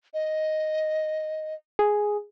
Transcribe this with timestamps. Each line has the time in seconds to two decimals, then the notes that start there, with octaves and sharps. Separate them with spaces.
0.14 D#5
1.79 G#4